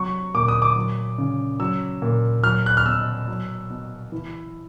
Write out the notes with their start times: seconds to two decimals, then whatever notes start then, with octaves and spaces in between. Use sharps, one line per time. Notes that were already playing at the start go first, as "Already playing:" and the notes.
Already playing: C3 F#3 C#6
0.35 A#2 D6
0.48 D#6
0.62 D6
0.76 F#3
1.18 C#3
1.59 F#3 E6
2.02 A#2
2.44 F#3 F6
2.66 F#6
2.77 F6
2.86 B2 E6
3.28 F#3
3.70 B2
4.12 E3